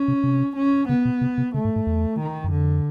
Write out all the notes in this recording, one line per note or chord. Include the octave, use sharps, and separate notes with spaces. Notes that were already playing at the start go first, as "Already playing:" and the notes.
Already playing: C#4
C3
C3
C#4
C#3 B3
B2
C3
C3
C#3 A3
G#2
G#2
E2
D#3
F#2
F2 D3